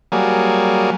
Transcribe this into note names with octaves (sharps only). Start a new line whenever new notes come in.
F#3 G3 A#3 G#4